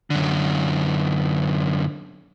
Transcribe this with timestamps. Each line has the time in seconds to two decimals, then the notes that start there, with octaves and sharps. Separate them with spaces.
0.10 F#2 D3